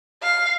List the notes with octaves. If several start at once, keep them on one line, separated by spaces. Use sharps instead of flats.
F5